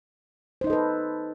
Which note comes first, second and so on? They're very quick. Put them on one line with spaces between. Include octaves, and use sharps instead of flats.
C5 D#4 D#5 A4 B4